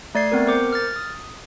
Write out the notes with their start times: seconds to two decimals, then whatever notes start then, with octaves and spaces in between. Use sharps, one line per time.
0.15 A3 D5 G#6 C7
0.32 B3 C4 A#4
0.48 A#4 C5 D6 G6 C#7
0.73 F6 A6
0.96 D#6